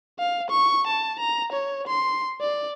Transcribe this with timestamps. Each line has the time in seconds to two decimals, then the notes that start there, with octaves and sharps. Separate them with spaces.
0.19 F5
0.50 C#6
0.87 A5
1.20 A#5
1.53 C#5
1.88 C6
2.41 D5